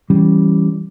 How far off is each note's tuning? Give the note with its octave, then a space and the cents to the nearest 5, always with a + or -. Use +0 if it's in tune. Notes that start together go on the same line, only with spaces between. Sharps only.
E3 +0 G3 -10 C#4 +0